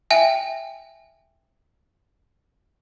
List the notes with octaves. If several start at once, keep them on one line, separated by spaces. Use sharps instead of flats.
E5 G5 G#5